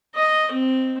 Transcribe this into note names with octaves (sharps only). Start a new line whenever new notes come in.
D#5
C4